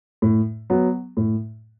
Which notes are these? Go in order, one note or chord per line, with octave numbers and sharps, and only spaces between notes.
A2
F#3 B3
A2